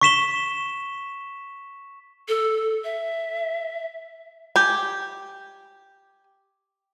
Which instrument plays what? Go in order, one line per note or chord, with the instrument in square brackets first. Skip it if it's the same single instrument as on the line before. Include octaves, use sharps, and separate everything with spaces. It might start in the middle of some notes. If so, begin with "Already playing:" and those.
[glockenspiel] C#6 B6 E7 G7
[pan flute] A4
E5
[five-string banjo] G4 G#5